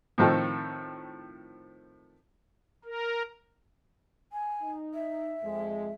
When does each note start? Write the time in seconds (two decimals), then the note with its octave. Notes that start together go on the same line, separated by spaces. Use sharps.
0.18 A2 D#3 F3 C4 D#4 A4
2.85 A#4
4.33 G#5
4.62 D#4
4.94 E5
5.43 F2 G#3